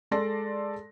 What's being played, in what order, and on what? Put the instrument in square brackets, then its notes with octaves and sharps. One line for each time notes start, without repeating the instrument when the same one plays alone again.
[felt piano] G#3 A4 D5 A5 C6 A#6